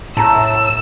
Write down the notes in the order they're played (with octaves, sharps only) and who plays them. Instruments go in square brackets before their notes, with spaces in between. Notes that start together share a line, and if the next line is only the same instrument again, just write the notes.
[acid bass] A2 [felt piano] A5 A#5 [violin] E6